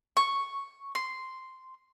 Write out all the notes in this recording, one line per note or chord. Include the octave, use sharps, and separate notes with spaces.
C#6
C6